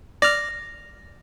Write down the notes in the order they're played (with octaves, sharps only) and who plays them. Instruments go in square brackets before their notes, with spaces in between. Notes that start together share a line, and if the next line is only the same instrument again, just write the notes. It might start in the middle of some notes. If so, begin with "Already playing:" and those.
[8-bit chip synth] D5 F6 [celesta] A#6